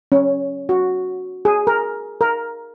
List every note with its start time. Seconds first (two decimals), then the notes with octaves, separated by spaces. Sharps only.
0.12 C#4
0.69 F#4
1.45 G#4
1.67 A#4
2.21 A#4